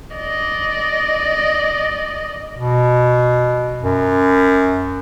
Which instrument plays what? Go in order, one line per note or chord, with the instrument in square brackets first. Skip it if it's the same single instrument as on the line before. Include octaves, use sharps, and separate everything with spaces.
[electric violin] D5 D#5
[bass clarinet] B2
F#2